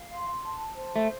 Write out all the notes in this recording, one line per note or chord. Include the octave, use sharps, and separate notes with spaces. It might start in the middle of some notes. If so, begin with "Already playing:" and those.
Already playing: F5
C6
A5
C5
A3